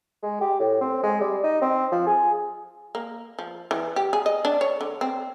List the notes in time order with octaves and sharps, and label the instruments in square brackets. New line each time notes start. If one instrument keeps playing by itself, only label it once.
[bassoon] G#3
G4
A2
C4
G#3
G3
D#4
C4
F3
G#4
[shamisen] A#3
F3
E3
G4
G#4
D#5
D4
C#5
D3
C4